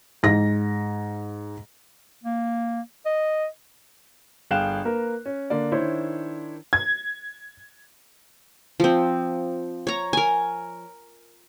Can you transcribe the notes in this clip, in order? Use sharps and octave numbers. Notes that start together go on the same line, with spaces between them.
G#2 A#6
A#3
D#5
G1 G#4 F5 G5 F#6 E7
A#3 A#4 B4
C#4
D3 A#3 D5
D#3 D4 E4 C5 C#5
G#6
F3 C4
C#5 A#5
A#4 G#5